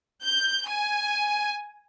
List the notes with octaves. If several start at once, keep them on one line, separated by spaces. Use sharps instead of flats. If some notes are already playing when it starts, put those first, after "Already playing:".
G6
G#5